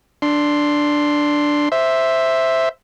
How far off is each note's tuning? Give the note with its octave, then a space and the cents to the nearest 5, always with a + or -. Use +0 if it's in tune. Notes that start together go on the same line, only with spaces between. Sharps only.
D4 +0 C6 +0
C5 +0 E5 +0